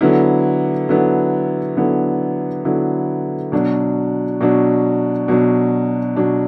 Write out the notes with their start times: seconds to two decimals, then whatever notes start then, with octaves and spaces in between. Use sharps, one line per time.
0.01 D3 F#3 B3 E4
0.89 D3 F#3 B3 E4
1.77 D3 F#3 B3 E4
2.65 D3 F#3 B3 E4
3.52 B2 F#3 D4
4.41 B2 F#3 D4
5.28 B2 F#3 D4
6.16 B2 F#3 D4